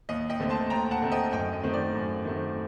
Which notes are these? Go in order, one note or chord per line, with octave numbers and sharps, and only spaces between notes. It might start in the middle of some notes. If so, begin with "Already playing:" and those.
D#2 D#5
D#5 G5
D3 A3 C4
A5 C6
D#2 G5 A#5
F#5 A5
D3 A3 C4
D#5 G5
F#2 D#5 G5
D#5
D#3 A3 C4
D5
F#2
D#3 A3 C4